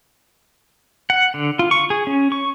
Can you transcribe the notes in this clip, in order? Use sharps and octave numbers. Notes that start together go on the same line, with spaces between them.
F#5
D3
F4
C#6
G#4
C#4
C#6